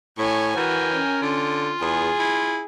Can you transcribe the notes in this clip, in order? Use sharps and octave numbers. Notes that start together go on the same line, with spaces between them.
A2 C#5 G#5
E3 F#4 A#4 G5 G#5
C#4
D3 F4
E2 G#4
E4